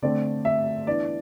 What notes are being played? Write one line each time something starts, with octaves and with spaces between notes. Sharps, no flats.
D3 A3 C4 D5
E5
E3 B3 D4 D5